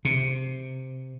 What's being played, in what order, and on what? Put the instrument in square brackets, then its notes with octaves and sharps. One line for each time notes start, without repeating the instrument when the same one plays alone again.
[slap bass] C3